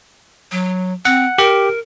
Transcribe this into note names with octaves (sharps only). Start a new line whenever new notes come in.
F#3
C4 F#5
G4 A#4